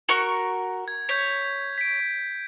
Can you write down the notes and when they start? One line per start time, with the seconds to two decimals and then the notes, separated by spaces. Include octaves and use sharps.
0.09 F#4 A#4 C#6
0.88 G#6
1.09 C#5 G6 B6
1.78 B6 D7